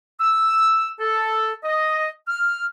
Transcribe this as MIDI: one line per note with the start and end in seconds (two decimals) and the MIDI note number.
0.20 0.89 88
1.00 1.53 69
1.63 2.09 75
2.27 2.65 89